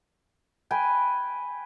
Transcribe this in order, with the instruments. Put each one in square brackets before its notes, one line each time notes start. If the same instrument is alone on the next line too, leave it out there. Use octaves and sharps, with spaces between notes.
[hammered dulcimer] B4 G5 G#5